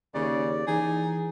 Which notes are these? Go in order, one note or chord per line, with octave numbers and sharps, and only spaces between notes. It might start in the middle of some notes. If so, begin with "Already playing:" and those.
D#2 C#3 D5
E3 D#4 G#4